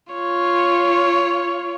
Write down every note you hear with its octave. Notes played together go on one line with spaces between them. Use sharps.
F4 C#5